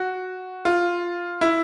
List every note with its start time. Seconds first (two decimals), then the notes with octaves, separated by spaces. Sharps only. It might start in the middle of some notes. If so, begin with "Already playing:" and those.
Already playing: F#4
0.65 F4
1.41 E4